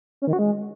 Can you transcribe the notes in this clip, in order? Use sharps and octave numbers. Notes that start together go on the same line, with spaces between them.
C#4
D#3
F#4
G#3